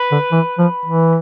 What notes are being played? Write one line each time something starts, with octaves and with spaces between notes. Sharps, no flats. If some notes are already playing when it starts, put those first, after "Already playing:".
Already playing: B4
D3
E3
F3
E3